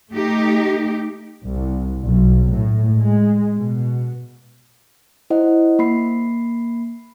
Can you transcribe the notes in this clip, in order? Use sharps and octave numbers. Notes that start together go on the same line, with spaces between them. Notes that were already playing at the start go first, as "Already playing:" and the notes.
A3 D#4 G4
C2
B1
A2
G#3
B2
E4 C5 D#5 F#5
A#3 B5 C7